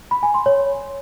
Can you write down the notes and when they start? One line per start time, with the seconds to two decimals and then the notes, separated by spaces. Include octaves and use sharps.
0.11 B5
0.23 G#5
0.34 C6
0.46 C#5